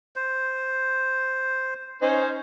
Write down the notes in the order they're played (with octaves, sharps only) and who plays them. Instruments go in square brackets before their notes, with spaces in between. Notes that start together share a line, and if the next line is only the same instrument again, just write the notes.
[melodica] C5
[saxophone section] C#4 D#4 C5